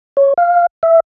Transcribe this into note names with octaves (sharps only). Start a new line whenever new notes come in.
C#5
F5
E5